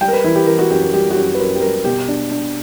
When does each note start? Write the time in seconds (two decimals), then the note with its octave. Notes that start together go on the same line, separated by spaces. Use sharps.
0.01 G3 G5
0.08 A#4
0.13 B4
0.24 E3 E4
0.35 G4
0.47 E3 A#4
0.59 F#4
0.70 F#2 G4
0.82 A#4
0.93 G3 G4
1.11 F#4
1.16 F#2 G4
1.35 B4
1.39 F#2 A#4
1.55 G4
1.61 G3 A#4
1.84 B2 G4
2.08 D4
2.31 D4